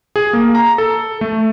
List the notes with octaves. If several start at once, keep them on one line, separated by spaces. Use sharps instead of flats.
G#4
A#3
A#5
A4
A3